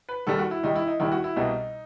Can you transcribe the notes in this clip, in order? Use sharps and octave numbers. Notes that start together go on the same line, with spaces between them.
B4
D#2 D#3 G3 A4
F#4
E4
D#2 D#3 G3 D#4
E4
D#4
D#2 D#3 G3 E4
F#4
E4
C2 B2 G3 D#4